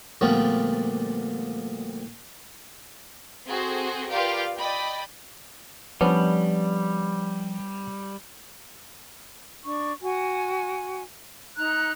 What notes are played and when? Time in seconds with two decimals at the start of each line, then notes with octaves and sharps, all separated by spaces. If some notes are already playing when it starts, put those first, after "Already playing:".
0.21 D2 A#2 F3 G3 B3
3.46 C4 F#4 G#4 A4 C5
4.11 F4 G4 A#4 B4 D5 F5
4.56 D5 D#5 G5 B5
6.01 F3 G3 B3 C#4 D4
9.65 D4 C#6
10.02 F#4 G#5
11.57 D#4 A#5 F#6